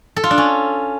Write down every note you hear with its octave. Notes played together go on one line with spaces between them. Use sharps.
A4
F4
D4
C#4